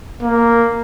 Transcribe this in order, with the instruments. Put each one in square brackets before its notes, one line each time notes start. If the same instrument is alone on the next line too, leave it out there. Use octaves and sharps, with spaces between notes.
[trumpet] A#3